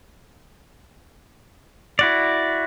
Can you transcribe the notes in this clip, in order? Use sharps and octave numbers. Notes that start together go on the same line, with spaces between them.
E4 F#4 D5